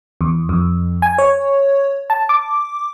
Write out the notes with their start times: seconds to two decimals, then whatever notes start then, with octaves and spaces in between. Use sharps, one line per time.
0.21 E2
0.49 F2
1.02 G#5
1.18 C#5
2.10 A5
2.29 D6